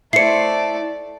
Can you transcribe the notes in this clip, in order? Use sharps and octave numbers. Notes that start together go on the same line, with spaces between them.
A3 E4 C5 D5 C7 C#7